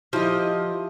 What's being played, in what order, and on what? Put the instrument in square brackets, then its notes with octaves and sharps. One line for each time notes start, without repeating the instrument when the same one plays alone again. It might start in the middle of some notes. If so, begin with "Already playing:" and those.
[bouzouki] F3 D#5 [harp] E4 F4 G4